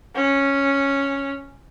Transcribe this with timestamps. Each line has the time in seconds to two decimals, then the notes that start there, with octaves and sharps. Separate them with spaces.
0.15 C#4